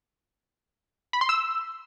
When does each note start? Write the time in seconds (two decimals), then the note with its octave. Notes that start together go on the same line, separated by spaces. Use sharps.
1.13 B5
1.21 C6
1.29 E6